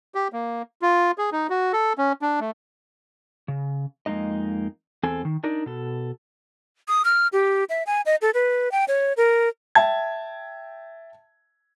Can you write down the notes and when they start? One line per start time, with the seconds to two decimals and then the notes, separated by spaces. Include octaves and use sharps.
0.15 G4
0.33 A#3
0.82 F4
1.18 G#4
1.32 D#4
1.50 F#4
1.73 A4
1.98 C#4
2.22 D4
2.40 A3
3.48 C#3
4.06 F2 G#3 A#3 D#4 D#5
5.03 E2 C4 A4 G#5
5.25 D#3
5.44 D4 D#4 A#4 D5
5.66 B2 A4
6.88 D#6
7.05 F6
7.33 G4
7.69 E5
7.87 G#5
8.06 D#5
8.22 A4
8.34 B4
8.72 G5
8.88 C#5
9.17 A#4
9.75 E5 G5 A5 G#6